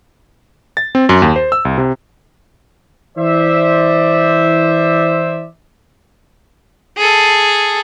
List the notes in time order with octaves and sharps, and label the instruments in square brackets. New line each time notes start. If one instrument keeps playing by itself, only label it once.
[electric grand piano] A6
C4
F#2
D#2
C5
E6
C2
C3
[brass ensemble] E3 C5 D5 E5
[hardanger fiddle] G#4 A4